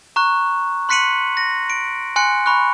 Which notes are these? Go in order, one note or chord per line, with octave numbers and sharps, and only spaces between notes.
A#5 C#6 F#6
C6 F#6 B6 C#7 D#7 F#7
A#6
D7
G#5 C6 F#6 C#7
B5 C#6 F#6